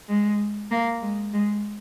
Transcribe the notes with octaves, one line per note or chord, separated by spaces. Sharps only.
G#3
A#3
G#3
G#3